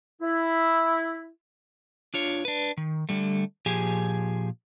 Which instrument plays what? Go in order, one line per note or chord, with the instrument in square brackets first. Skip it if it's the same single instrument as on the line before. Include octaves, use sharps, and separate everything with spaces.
[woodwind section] E4
[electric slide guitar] D4 F4 C#5
D4 B4
D#3
D3 G3 A3
A#2 F3 G4 G#4 G#5